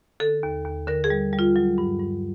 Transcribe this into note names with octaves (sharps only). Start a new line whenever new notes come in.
D3 A4
D#2
D#2
D3 A#4
G#4
G3
G3
F4
F#3
G2
G2